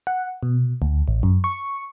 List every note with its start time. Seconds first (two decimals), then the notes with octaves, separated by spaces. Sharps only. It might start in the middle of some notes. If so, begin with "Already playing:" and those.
0.07 F#5
0.43 B2
0.82 D2
1.08 A1
1.23 F#2
1.44 C#6